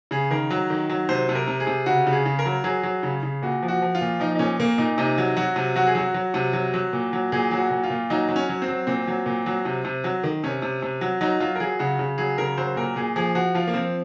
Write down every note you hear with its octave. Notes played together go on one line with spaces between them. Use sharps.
C#3 G#4
D#3 A#4
F#3
D#3
F#3
C3 C5
C3
A#4
C3
G#4
C3
C#3 F#4
C#3
G#4
C#3
A#4
F#3
F#3 G#4
F#3
C#3
C#3
A#2 F#4
F3
F#4
F3
F4
A#2
F3 D#4
D#4
A#2 C#4
A#2 A#3
A#2 D#4
C3 D#4
F#3
F#3 F#4
C3
F#3 F#4
G#4
F#3 F#4
F#3
C3
F#3
F#3
A#2
F#3
A#2 G#4
F#3
F#4
A#2
F4
A#2
F#3 D#4
F#3
C#4
F#3
C4
F#3
A#2 C4
F#3
A#2
F#3
C3
C3
F#3
D#3
C3 C#4
C3
C3
F#3
F#3 D#4
F#3 F4
A#4
F#3 G#4
C#3 F#4
C#3
F#3 G#4
C#3 A#4
F#3 C5
A#2 A#4
A#2 G#4
F3 G#4
F3 F#4
F3 F4
A#3
F3 C4